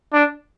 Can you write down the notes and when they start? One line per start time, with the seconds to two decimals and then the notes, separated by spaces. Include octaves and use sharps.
0.13 D4